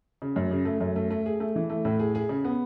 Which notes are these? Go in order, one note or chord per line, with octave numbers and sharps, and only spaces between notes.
C#3
F#2
C#3
A3
F#2
A3
A3
G#4
A3
E3
A3
A2
G#4
G#4
C#3
B3